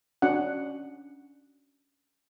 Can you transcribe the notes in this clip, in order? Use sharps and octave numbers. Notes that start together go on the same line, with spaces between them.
C#4 D4 F#4 F#5